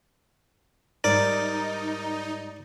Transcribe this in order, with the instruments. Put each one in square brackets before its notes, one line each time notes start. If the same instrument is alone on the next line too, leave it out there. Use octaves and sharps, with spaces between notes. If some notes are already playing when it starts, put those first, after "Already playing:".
[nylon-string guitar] G#2 G3 [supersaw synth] D#4 [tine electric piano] A#4 [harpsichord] D5